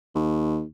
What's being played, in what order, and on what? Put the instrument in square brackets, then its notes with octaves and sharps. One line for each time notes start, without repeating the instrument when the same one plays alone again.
[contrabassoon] D#2